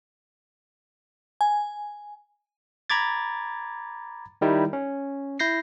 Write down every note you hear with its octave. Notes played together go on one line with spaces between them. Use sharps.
G#5
A#5 B5 D6 G#6 A6
D#3 G3 D#4 E4
C#4
E4 G6 A#6 C7